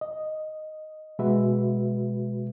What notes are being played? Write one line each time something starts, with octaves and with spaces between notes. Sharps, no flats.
D#5
B2 G#3 F#4 B4 E5